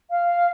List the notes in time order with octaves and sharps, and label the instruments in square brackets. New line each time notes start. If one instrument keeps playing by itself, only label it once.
[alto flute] F5